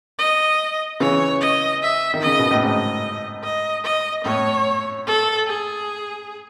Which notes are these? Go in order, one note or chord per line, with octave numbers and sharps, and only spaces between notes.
D#5
C#3 E3 C#5
D#5
E5
D#3
C#3 D#5
B2
A2
G#2 D#5
D#5
D#5
A2 C#5
A4
G#4